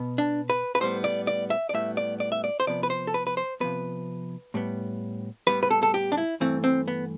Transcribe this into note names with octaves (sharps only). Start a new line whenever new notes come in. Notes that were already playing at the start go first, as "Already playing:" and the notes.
Already playing: B2 B3
D4
B4
B4
A2 G3 B3 C5
D5
D5
E5
D5
A2 G3 B3 E5
D5
D5
E5
D5
C5
C3 F3 B3 D5
B4
C5
A4
B4
B4
C5
C3 F3 B3 B4
A2 G3 B3
A2 G3 B3 B4
B4
A4
A4
G4
D4
E4
G2 E3 A3 C4
C4
B3